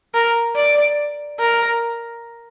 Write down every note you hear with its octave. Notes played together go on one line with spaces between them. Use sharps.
A#4
D5
A#4